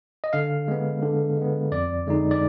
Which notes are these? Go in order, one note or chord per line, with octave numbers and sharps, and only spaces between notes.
D#5
D3 F5
G#3 B3
D3
G#3 B3
F2 D5
D3 G#3 D#4
D5